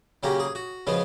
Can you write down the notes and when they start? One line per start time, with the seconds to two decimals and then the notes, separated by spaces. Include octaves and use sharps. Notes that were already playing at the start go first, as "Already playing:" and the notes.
0.23 C#3 F#3 A#3 C#4 G4
0.40 G#4
0.55 F#4
0.87 C#3 F3 G#3 B3